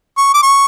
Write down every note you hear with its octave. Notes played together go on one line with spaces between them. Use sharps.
C#6
D6
C#6